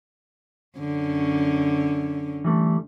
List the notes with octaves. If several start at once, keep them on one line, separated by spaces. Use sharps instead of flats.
F#2 D3 C#4
E3 G3 A3